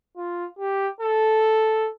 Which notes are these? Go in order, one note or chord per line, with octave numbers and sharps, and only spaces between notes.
F4
G4
A4